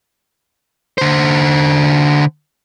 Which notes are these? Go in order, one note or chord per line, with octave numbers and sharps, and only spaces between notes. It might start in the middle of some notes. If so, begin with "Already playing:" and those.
D3 C5